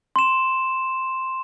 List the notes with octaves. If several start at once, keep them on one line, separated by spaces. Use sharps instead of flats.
C6 E7